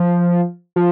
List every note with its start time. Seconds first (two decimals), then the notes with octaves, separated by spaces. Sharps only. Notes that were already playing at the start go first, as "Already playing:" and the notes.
Already playing: F3
0.76 F3